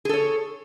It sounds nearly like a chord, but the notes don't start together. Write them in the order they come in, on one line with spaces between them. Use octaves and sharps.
G#4 A4 C#5